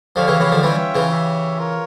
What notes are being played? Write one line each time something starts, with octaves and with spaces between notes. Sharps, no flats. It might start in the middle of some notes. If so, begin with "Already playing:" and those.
D3 F3 G4 C#5 F5
C#3 E3
C#3 E3
D3 F3
E3 G3 C#4 F4 C#5 E5 G5
C#3 E3
G4 C#5 E5
F4 A#4 C#5